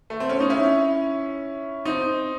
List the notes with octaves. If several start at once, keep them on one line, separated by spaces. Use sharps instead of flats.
A3
C4
C#4
D#4
C#4 E4
C4 D#4